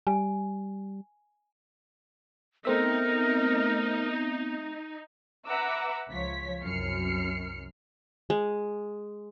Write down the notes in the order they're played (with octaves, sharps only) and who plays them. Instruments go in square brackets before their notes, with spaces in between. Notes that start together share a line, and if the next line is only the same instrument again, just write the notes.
[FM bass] G3 [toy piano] G#5
[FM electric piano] A3 C4 E5 [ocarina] B3 [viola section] D#4 [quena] A#4
[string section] B4 E5 F#5 A#5 D6 E6
C#2 F3 C#5 B6
C2 F#2 F#3 F6 C7 C#7
[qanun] G#3